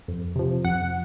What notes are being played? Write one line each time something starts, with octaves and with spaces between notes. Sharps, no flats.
F2
C3 F3
F2 F#5